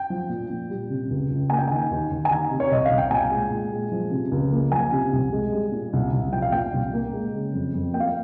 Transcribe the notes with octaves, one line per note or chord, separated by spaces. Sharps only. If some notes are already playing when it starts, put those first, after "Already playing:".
Already playing: G5
F3
A#2
A#2
G3
C3
C#2
C#2
A#3 G#5
G5
D#3 G#5
D#2
D#2
G#5
D#3 A#5
C3
C#5
C2 D#5
F5
C2
G5
A#2 G#5
G#3
A#2
G#3
F3
C3
C#2
A#3
F3 G#5
C3
C2
G#3
G3
A#2
C2
C2
F3 G5
F5
A#2 G5
C2
A#3
G#3
C#3
F2
F2
A#3 G5
F5